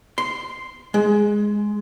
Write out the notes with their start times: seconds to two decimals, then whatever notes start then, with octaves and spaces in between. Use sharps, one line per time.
0.18 C6
0.94 G#3